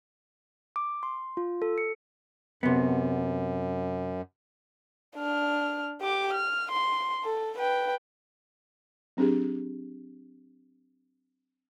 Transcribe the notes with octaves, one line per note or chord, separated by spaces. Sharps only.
D6
C6
F4
A4
C#7
F#2 C3 B3
D4 F6
G4 D6
F6
C6
A4
B4 G5
F#3 C4 D4 G4 G#4